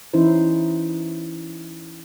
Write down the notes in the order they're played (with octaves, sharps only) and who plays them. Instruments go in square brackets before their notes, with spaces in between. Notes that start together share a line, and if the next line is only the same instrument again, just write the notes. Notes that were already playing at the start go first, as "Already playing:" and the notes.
[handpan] E3 C#4 D#4 E4 C5